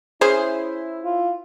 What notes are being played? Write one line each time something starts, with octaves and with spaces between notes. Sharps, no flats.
C#4 E4 G#4 C5
F4